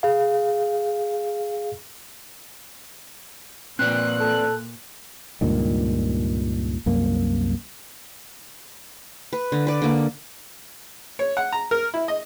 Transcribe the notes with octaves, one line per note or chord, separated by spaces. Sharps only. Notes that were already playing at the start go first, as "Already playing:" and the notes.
G#4 F5
A#2 C4 B4 D5 F#6
A4
C#2 G2 A#2 D#3
C2 F#2 A#3
B4
D3
B4 D5
D3 A#3
C#5
F#5
A#5
A#4
E4
D#5